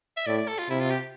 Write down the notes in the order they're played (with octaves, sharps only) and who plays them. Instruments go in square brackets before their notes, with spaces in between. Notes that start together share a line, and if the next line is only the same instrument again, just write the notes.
[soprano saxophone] E5
[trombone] A2 [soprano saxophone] D5
[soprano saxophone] D5
A4
F4
[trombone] C3 [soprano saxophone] E4
[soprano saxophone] F4
G4